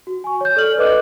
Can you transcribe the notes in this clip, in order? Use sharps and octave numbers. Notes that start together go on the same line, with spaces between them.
F#4
G#5 C#6
C#5 G6
A4 D5 F6 F#7
A4 B4 D#5 D6 F#6